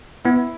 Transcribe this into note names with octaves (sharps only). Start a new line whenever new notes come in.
B3 E4